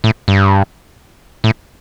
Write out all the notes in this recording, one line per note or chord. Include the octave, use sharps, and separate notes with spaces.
A2
G2
A2